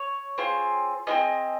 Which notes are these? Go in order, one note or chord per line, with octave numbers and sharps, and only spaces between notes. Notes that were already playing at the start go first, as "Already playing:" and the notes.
Already playing: C#5
C4 F4 G#4
C4 F4 G#4 D#5